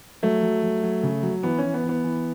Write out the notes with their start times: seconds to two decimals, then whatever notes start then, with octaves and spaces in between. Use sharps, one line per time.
0.23 F#3 A3
0.43 F#3
0.63 F#3
0.83 F#3
1.03 C#3
1.23 F#3
1.43 E3 B3
1.58 E3 C#4
1.74 B3
1.83 E3
1.89 B3
2.04 E3